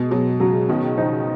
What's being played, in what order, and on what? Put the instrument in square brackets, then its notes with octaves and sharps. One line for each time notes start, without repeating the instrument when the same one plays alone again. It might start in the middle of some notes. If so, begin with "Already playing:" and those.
Already playing: [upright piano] B2 [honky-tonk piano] G#3
[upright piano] B2 [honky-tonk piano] F#3
[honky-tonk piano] C#3 [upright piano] F#3
[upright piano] B2 [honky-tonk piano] D#3
[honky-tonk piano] F3 [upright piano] D#4